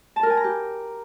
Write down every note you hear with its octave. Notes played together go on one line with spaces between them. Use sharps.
A5
A#4
G#5
A#5
G4